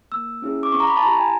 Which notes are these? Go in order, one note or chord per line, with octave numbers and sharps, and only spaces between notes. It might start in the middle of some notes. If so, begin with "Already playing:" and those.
A#3 E6
C#4 E4 G#4
D6
C4 C#6
A#5
B5
A5
E4 G4 A#5
G#5